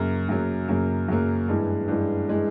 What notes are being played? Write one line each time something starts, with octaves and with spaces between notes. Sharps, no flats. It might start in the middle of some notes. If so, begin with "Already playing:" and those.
Already playing: F#2 C#3 F#3 A#3
F#2 C#3 F#3 A#3
F#2 C#3 F#3 A#3
F#2 C#3 F#3 A#3
G2 E3 G#3
G2 E3 G#3
E3 G#3